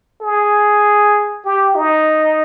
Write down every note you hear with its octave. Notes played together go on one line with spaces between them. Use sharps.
G#4
G4
D#4